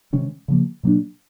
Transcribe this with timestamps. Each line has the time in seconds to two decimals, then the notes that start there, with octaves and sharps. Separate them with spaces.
0.13 C3 D#3 G#3 C#4
0.48 C#3 F3 A#3
0.83 B2 F#3 A#3 D4